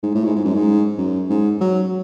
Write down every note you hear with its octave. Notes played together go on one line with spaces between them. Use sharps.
G#2
A2
G#2
G#2
F#2
G#2
F#2
G#2
F#3